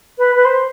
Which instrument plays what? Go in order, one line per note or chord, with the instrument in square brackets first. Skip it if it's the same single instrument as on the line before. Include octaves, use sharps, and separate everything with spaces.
[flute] B4
B4
C5